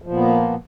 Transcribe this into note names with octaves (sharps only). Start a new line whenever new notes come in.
A#2 F3 A#3 B3